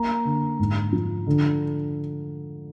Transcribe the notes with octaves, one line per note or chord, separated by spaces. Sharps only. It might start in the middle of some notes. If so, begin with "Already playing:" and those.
Already playing: A#3 A#5
D3
G#2
F3
D3